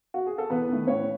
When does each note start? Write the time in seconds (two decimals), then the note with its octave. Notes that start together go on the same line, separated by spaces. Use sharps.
0.14 F#4
0.27 G#4
0.38 A4
0.50 E2 B3 B4
0.69 D#3 A3
0.87 A2 C#4 C#5